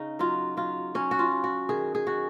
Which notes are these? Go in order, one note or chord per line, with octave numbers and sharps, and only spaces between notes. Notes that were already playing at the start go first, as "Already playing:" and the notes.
Already playing: C#3 D#4
F#3 F4
F#3 F4
F#3 C#4
F#4
F4
F#3
F#4
D#3 G#4
G#4
D#3 F#4